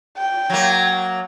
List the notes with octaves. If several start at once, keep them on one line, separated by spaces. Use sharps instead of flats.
G5
F#3 A#3